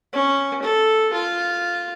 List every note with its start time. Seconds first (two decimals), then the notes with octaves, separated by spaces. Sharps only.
0.13 C#4
0.62 A4
1.13 F4